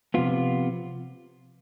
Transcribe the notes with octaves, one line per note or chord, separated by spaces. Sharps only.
C3 F3 B3 F4